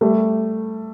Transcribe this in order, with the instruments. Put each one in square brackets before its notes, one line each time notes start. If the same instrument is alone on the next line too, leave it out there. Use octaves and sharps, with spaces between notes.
[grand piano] G3 A3